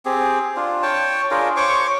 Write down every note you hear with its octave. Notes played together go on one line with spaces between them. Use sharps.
C4 G4 G#4
D4 F4
C#5 G5 A5
D4 F4 G#4 A#4
C5 C#5 C#6 D6